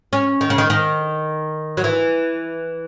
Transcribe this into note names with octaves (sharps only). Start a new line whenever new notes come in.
C#4
D#3
C#3
D#3
D#3
F#3
E3